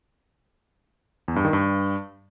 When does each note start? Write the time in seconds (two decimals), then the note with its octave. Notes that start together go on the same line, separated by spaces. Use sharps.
1.28 E2
1.36 G2
1.45 D#3
1.53 G2